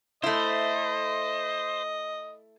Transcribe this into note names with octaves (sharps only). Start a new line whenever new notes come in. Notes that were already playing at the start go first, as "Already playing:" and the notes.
A3 E4 C5 D#5